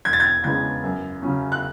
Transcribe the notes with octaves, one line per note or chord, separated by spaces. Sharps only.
E1 G#6
A6
G#6
E2 C#3 G#3 B3 G#6
F#2
C#3 F#3 C#4
F#6